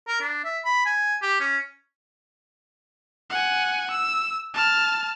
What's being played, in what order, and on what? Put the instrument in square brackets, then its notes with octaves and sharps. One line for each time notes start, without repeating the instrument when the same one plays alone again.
[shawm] A#4
D4
E5
B5
G#5
G4
C#4
[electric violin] F#5 G#5
E6
A5 F6